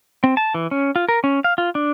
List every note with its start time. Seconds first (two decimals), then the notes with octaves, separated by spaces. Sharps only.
0.24 C4
0.37 A5
0.54 E3
0.71 C#4
0.96 F4
1.09 A#4
1.24 C#4
1.44 F5
1.58 F4
1.75 D4